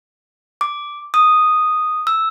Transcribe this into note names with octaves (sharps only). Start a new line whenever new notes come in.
D6
D#6
E6